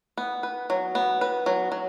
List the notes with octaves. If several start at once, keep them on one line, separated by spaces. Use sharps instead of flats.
B3
B4
F#3
B3
B4
F#3
F#3